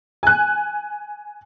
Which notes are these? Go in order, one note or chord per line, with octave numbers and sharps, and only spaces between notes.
G#5 F#6